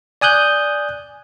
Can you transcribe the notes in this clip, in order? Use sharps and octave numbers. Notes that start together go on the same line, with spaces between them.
D5 G#5 D#6 F#6 G6